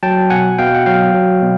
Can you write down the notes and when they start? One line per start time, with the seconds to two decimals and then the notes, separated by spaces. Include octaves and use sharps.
0.03 F#3 G5 A5
0.30 B2 F#5 G#5
0.58 B2 F5 G5
0.75 F#5
0.86 F#3 F5 G5
1.14 F#3
1.42 B2